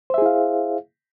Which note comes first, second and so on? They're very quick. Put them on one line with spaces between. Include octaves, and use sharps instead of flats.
C5 E5 G#4 E4 F5